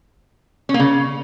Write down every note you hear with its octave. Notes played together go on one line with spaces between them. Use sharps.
C#4
A#3
C#3